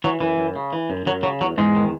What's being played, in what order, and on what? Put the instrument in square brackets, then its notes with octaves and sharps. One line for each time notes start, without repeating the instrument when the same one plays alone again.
[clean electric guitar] E3 F#3
F#2 E3
F#2
C#3
E3
F#2
F#2 F#3
C#3 F#3
E2 F#3
E2 G#2 G#3
D#3